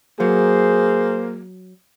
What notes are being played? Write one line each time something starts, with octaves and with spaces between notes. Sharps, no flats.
F#3 A#3 G#4 C5